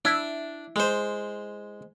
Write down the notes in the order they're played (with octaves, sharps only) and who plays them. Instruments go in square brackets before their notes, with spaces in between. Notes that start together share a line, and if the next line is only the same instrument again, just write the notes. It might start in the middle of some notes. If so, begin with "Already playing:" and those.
[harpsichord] D4 [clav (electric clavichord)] E4
[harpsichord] G#3 C5